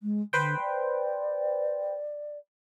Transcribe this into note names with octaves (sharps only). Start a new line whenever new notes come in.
G#3
D3 B4 C5 G5
D5